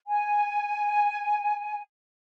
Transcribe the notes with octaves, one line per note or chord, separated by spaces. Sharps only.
G#5